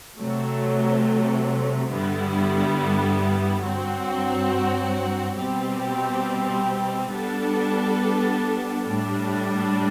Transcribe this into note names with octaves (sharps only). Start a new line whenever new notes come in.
C3 F#3 A3
G2 D3 G3 B3 E4
G2 F#3 C4 F#4
B2 G3 C4 G4
G3 B3 D4 A4
A2 G3 D4